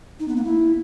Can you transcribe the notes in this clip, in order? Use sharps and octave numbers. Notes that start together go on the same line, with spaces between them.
D#4
B3
A#3
E4